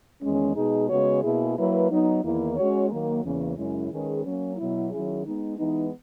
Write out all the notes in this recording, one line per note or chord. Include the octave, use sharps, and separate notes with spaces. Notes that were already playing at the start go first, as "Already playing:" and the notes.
E2 D#3 G#3 C#4
B2 G#3 D#4 G#4
C#3 G#3 B3 F#4 C#5
B2 A#3 E4 G#4
F#3 A#3 E4 B4
F#3 B3 D#4
E2 D#3 A#3 E4
G#3 C#4 F#4 C#5
D#3 F#3 A#3
E2 C#3 E3 A#3 C#4
F#2 C#3 G#3 C#4 E4
D#3 G#3 C#4 G#4 B4
F#3 A#3 C#4
B2 F#3 B3 E4
D#3 F#3 C#4 E4 G#4
G#3 B3 D#4
E3 G#3 B3 D#4